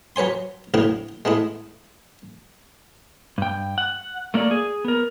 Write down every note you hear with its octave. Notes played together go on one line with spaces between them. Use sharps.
F#3 B4 C#5 G#5 C6
B1 A2 D3 B3 E4 G5
G#3 A3 B3 E4
G2 G5
F#5
A3 A#3 A4 D5
G#4
B3 A#4